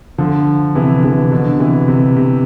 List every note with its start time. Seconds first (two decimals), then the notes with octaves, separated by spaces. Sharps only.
0.18 D3 F3
0.75 C3 E3
0.99 D3
1.03 C3 E3
1.32 B2 D3
1.60 C3 E3
1.88 C3
2.16 C3